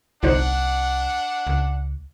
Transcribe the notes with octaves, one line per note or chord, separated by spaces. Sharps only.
G1 C2 D4 D#4 C5 F#5
C#2